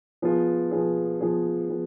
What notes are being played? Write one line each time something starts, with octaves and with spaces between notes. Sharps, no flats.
F3 B3 F4 G#4
F3 B3 F4 G#4
F3 B3 F4 G#4
F3 B3